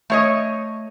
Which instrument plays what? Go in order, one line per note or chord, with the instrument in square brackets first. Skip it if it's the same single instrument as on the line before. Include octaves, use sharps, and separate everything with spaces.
[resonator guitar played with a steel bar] A3 C#5 D#5